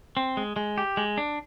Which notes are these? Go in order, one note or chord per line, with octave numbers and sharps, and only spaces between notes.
C4
G#3
G#3
G4
G#3
D4